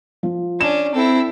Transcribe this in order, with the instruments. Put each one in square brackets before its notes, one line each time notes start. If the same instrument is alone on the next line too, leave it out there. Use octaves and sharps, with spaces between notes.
[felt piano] F3
[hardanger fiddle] C#4 D4 [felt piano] E7
[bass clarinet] C4 [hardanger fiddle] E4 A4